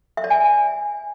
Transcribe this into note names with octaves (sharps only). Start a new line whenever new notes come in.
E5
D5
G#5